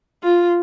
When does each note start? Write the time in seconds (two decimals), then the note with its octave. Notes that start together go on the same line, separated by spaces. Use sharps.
0.23 F4